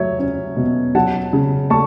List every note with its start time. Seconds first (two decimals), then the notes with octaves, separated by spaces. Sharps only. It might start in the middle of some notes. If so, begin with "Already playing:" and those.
Already playing: F#3 A3 C#5 E5
0.19 C#4
0.57 B2
0.95 F#3 F#5 A5
1.33 C#3
1.70 A3 A5 C#6